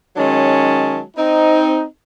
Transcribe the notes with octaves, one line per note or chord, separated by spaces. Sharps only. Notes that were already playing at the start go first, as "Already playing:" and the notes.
D#3 F#3 G#3 C#4 A5
C4 D#4